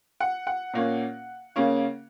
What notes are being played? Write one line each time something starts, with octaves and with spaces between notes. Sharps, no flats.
F#5
F#5
A#2 A#3 C#4
C#3 A#3 C#4